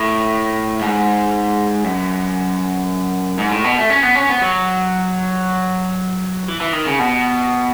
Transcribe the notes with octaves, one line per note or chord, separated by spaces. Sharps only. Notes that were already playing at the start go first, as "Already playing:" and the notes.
Already playing: A2
G#2
F#2
G#2
A2
B2
A3
C#4
B3
C#4
B3
F#3
E3
E3
D#3
C#3
B2